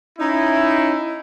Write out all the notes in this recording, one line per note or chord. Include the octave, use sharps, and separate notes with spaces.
C#4 D#4 E4